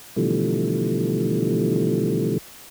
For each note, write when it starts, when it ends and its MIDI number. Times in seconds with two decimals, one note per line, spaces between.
0.16 2.38 47
0.16 2.38 50
0.16 2.38 52
0.16 2.38 53
0.16 2.38 55
0.16 2.38 57